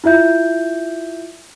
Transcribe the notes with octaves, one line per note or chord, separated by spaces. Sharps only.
E4 F4 E5 G6